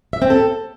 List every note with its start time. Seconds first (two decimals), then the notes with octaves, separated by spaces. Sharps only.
0.13 E5
0.22 C4
0.30 A4